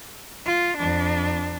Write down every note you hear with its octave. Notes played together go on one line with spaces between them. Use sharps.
F4
F2 D4